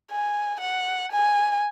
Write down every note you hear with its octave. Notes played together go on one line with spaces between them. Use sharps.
G#5
F#5
G#5